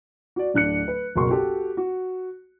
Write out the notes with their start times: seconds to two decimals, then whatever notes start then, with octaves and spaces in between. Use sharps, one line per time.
0.36 F#4 D5
0.54 D1 D4 F#6 C#7
0.88 B4
1.16 F#1 B1 F#4 A#4 C6 C#6
1.30 F#4 G4 A4
1.77 F#4